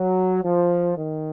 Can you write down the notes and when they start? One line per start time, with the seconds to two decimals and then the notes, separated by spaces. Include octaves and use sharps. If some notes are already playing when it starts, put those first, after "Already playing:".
Already playing: F#3
0.43 F3
0.96 D#3